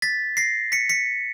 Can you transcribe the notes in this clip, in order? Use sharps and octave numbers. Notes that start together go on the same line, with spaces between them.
A6 B6
A#6 C7
B6 C#7
B6 C#7